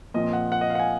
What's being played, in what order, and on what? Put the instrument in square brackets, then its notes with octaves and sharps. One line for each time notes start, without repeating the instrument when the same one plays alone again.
[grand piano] A#2 F3 C4 D#5
F#5
F#5
D#5
F5
F#5
G#5